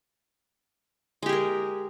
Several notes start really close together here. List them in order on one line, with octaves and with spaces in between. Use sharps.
G#3 G4 G#4 A#4